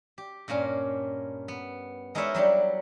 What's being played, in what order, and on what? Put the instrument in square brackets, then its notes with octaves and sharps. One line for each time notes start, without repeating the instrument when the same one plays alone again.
[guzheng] G4
G2 A#2 A#3 C#4
B3
G#3 D#4 E4 A#4 C#5 E5
F#3 G3 D4 G4